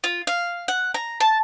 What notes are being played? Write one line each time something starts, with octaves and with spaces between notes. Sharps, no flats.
F4
F5
F#5
A#5
A5